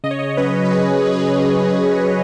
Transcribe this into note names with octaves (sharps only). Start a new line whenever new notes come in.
C#3 D#5
C#5
D#5
F#3 C#4 B4
B4
C#3 G#4
F#3 C#4 B4
C#5
B4